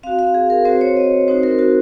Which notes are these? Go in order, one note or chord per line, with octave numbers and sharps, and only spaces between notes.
C4 F#4 F5
F5
G#4
A#4
C4 F#4 C5
C#5
D#5
C4 D#4 F#4 C5
A#4
F#4